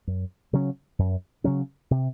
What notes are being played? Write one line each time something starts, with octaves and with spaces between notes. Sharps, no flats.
F#2
C#3 F#3 C#4
F#2
C#3 F#3 C#4
C3